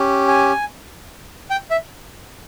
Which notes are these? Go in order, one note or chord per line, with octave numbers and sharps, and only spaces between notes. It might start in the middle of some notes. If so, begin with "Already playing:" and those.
Already playing: C#4 G4
G#5
G5
E5